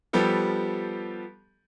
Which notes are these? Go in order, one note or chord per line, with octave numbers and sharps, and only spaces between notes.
F3 G3 B3 G4 A4